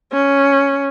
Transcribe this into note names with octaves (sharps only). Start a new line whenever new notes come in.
C#4